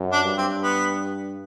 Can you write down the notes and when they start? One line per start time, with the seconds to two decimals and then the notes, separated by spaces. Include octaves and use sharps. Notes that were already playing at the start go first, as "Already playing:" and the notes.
Already playing: F#2
0.12 D4
0.24 G2
0.38 C4
0.63 B3